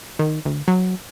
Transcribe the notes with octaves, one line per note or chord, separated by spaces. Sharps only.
D#3
D2
F#3